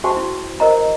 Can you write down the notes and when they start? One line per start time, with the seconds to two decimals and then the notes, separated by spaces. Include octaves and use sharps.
0.04 F#4 C5 G5 A5 C#6
0.17 E4
0.60 A#4 C5 D#5 A#5